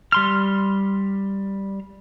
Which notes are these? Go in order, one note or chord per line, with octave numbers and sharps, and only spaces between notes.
G3 C6 F6